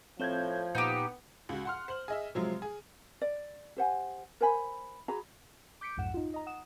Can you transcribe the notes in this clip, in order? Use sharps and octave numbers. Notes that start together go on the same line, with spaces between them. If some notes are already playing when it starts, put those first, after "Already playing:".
A2 F3 C4 G6 G#6
A#2 B3 D#4 G4
C#2 F#4
F#5 C6 F6
C5 F#7
G#4 D#5 E5
C3 F3 F#3 G#3
G#4
D5
G4 C5 F#5 G#5
A#4 C5 G#5 B5
F#4 G#4 A#5 B5
D6 G6 B6 C#7 D7
B1 F2 G#2 F#5 E7
D#4 F4
D#5 A#5
F#5 D#6 E7